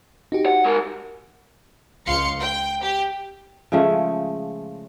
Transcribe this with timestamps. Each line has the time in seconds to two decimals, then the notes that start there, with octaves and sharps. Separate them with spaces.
0.32 D#4 F#4 G4
0.46 F#5
0.65 G#3 A#4
2.07 C#2 F5 C6 C#7
2.40 G5
2.82 G4
3.72 C#3 F3 G#3 A3